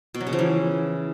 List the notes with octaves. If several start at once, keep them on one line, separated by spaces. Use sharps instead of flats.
B2
F#3
C#3
F3
E3